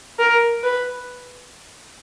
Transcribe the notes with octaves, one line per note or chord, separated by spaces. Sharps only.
A#4
B4